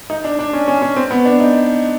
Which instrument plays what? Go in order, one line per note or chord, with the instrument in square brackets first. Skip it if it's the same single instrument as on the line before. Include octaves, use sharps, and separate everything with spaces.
[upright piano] D#4
D4
D4
C#4
C#4
C#4
C4
B3
D4
D#4